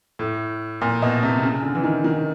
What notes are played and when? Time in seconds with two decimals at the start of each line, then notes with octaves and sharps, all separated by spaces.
0.19 A2
0.81 A#2
1.02 B2
1.23 C3
1.43 C#3
1.63 D3
1.75 E3
1.84 D#3
2.04 D#3